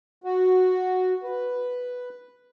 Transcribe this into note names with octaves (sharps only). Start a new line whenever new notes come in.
F#4
B4